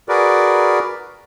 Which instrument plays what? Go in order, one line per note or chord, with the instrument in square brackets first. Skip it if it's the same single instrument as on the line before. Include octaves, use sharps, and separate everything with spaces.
[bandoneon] F#4 G#4 A#4 B4 D5